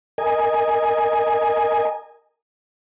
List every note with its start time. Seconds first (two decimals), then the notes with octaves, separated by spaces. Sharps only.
0.18 A#4 D#5 G#5